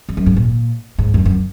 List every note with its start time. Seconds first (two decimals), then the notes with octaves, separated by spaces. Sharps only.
0.09 F2
0.17 F#2
0.26 G#2
0.36 A#2
0.98 G#2
1.14 F#2
1.25 F#2